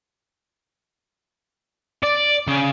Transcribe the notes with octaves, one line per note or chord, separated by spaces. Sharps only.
D5
C#3